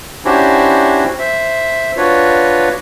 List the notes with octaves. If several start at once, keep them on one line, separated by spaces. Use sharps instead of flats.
C#4 D4 E4 F#4 G4 C5
C5 E5
D4 F4 F#4 B4 C#5